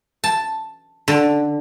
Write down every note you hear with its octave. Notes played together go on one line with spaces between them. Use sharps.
A5
D3